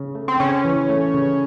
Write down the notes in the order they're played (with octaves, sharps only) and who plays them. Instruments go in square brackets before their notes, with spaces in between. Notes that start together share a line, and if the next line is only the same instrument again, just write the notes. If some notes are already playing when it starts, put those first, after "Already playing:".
Already playing: [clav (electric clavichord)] C#3
A3
[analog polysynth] C4
[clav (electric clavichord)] C#3 [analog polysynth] C#4
[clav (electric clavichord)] E3
A3
C#3